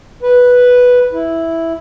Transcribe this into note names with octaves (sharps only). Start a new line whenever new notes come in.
B4
E4